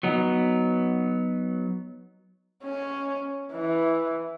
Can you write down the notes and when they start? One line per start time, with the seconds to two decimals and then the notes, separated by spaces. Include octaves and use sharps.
0.03 F#3 B3 D#4
2.63 C#4
3.53 E3